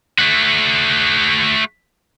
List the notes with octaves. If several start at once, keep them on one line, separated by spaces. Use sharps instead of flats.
A3 F#4